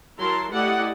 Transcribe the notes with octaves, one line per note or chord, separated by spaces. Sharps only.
F#3 E4 A#4 A5 A#5 C6
A3 E4 G4 D5 D#5 F#5